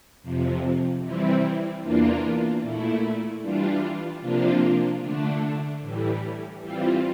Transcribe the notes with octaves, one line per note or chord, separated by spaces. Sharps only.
F2 C3 F3
C3 E3 G3 C4 E4
E2 E3 A#3 D4 F4
A#2 A3 E4
E3 G3 D4 F4
C3 F3 A#3 D4 F4
D3 A3 D4
A2 E3 G3
E3 G3 C4 F4